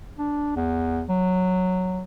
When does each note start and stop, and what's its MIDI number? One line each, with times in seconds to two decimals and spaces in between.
0.18 0.54 62
0.56 1.03 40
1.09 2.04 54